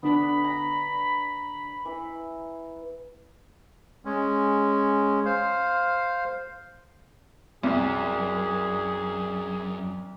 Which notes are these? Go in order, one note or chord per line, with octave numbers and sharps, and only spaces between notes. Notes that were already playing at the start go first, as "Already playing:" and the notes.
D3 B3 D4 B5
A#5
E3
G#3 C#4
C5 F5
C2 F#2 G#4